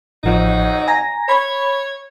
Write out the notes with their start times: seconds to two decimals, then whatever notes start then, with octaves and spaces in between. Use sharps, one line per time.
0.24 A1 F2 F3 F#3 D#4
0.88 G#5 A#5 A#6
1.29 C#5 B5